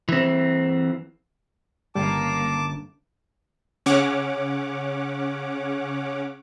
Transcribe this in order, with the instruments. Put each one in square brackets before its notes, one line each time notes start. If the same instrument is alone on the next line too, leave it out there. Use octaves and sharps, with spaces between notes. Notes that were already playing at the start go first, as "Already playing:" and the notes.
[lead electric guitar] E3 C4
[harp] G1 C#4 [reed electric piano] G3 [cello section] A#3 [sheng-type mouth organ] A5 D6
[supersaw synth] C#3 C#4 C#5 F#5 D6